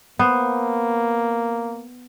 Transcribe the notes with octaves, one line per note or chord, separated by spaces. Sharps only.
A#3 B3 C5